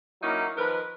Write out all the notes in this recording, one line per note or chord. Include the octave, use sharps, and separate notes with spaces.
F#3 A#3 C#4 D#4 E4 F#4
D#3 F3 A#4 B4